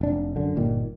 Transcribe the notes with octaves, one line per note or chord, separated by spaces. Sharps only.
F1 D4
F#2 D3
G1 D#2 A#2 D#3